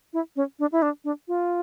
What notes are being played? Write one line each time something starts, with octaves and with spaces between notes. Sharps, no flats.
E4
C#4
D4
E4
D4
D4
F4